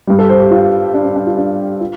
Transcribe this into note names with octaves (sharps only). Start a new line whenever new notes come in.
G2 G3
A4
C5
G4
F4
D4
D4
D4
F4
D4
F4